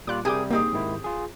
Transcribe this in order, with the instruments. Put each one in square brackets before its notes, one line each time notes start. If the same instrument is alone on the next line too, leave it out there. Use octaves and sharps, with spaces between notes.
[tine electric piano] A#2 G3 F4 [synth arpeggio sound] D6 F#6
[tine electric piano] C3 G3 [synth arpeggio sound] G4 G5 D6 [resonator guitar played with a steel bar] G#4 A#4
[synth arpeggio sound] A#3 D#4 [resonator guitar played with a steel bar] C4 G4 G#4
[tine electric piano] G#2 D#3 E4
F4 G#4